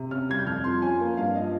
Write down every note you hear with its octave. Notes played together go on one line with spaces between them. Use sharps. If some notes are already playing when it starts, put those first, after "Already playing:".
Already playing: C3
C#4 F6
G3 G#6
G6
F2 F6
F3 C6
C#4 G#5
A#3
G2 F5
F3 D#5